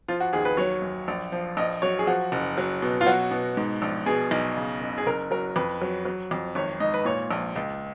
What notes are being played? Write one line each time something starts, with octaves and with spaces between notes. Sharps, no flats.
F3 F4
F#4
D#2 G#4
B4
F#3 C#5
F#2
A#1
F3
A#1 D#5
F#3 C#5
G#4
F3 F#4
F#1
F#3
B2
F4
F#3 F#4
B2
G#2
A#1
B2 G#4
B1
C#3
F#1
G#4
F#1 A#4
F#3 A#4
F2 B4
F#3
F#3
F2
G#1 C#5
G#2 D#5
B4
A#2 C#5
A#1
C#2